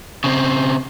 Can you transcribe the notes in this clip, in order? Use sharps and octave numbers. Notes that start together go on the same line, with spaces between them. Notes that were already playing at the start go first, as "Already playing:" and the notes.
C#3 C4